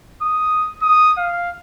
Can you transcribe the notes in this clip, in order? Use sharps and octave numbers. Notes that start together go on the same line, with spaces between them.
D#6
D#6
F5